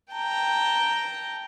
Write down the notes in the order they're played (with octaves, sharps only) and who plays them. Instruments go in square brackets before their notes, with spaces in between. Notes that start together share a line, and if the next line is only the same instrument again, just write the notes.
[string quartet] G5 A5 A#5